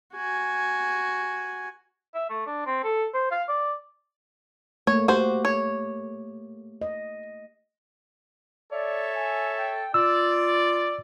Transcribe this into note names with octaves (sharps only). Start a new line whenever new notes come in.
F#4 G#5
E5
A3
D4
C4
A4
C5
F5
D5
A3 A#3 C#5
F#4 G4 C5
C#5
D#5
A4 C#5 D5 E5
G#5
G5
F4 D5 E6